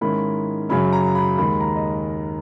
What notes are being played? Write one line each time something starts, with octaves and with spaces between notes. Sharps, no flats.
G#2 D#3 A#3 C#4 E4 B5
F#2 C#3 F#3 C#4 B5
A#5
B5
D#2 D#3 G#3 B5
A#5
D#5